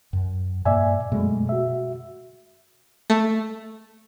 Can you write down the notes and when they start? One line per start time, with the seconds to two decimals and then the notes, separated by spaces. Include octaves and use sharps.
0.13 F#2
0.65 G2 A#2 A#3 D5 E5 G#5
1.12 F#2 B2 G#3 A3
1.49 F#4 E5
3.10 A3